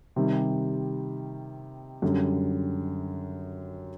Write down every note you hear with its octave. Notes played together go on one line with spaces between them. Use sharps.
C3 D#3 G3
F#2 D3 G3